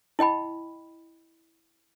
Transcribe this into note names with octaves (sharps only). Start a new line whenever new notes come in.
E4 D#5 G5 B5